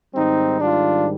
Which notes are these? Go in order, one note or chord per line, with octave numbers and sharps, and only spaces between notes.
G#2 D#3 G3 C4 D#4
D4 F4